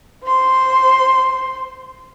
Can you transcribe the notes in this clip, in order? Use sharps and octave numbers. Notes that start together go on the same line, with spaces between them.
C5 C6